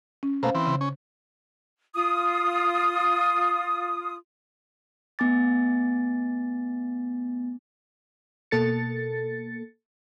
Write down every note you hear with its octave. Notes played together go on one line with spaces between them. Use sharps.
C#4
B2 A3 A#3 C5 F5
E3 C4
C#3
C#4
F4 D#6
A3 B3 G#5 D6 A6
B2 A#3 A4 A6 C#7